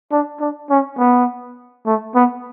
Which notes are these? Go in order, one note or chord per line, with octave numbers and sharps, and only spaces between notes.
D4
D4
C#4
B3
A3
B3